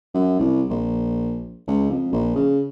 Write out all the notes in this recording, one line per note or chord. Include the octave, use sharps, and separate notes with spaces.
F#2
C2
A#1
C#2
F2
A#1
C#3